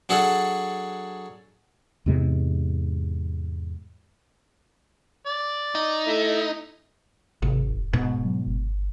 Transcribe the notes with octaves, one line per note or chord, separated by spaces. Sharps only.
F#3 D4 G#4 A4 F#5
E2 G#2 C3 G#3
D5
D#4
A3 E4
G#1 C3
E1
D1 G#2 B2
F#3
G1